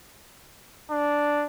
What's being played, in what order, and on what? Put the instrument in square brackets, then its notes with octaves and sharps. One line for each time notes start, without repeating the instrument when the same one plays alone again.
[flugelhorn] D4